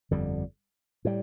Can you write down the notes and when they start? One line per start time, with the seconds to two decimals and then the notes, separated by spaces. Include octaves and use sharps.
0.11 G1 F2 D3 G3
1.05 A2 G3